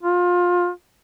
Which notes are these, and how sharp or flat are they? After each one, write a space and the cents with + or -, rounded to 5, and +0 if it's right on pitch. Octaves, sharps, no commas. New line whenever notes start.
F4 +25